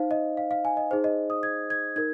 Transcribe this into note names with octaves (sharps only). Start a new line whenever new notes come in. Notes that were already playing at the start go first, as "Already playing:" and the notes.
Already playing: D#4 C5 F5
D#5
F5
F5
G#5
D#5
D#4 G#4 C5
D#5
D#6
G#6
G#6
D#4 A#4 G#6